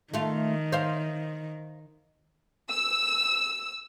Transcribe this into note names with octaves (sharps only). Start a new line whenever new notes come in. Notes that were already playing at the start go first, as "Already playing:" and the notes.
D#3 A3 F4
C5 F5
E6